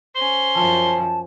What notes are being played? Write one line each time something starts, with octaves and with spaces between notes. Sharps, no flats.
C#4 C5 C6
F#2 F3 A5